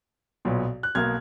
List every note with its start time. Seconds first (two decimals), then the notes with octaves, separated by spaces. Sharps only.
0.45 B1 A#2 F#3 B3
0.83 F#6
0.95 B1 B2 A#3 F6 G#6